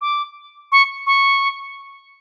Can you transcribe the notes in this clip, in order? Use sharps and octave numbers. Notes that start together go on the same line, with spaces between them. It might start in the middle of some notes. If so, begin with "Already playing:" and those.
D6
C#6
C#6